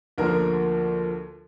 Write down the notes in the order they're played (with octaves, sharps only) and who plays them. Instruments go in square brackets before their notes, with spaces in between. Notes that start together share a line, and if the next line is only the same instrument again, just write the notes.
[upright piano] D2 D3 F3 A#3 A#4